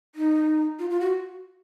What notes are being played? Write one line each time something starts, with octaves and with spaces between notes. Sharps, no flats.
D#4
F4
F4
F#4